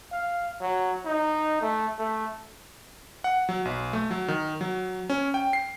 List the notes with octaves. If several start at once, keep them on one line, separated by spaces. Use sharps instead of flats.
F5
F#3
D#4
A3
A3
F#5
F#3
B1
A3
F#3
D#3
F#3
C#4
G5
C7